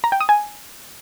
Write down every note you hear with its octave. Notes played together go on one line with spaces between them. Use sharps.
A#5
G5
D#6
G#5